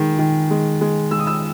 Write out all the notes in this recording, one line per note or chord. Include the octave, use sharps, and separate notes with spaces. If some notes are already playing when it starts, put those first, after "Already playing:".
Already playing: D#3 G#3
D#3
G#3
G#3
G#3 E6
D#6
E6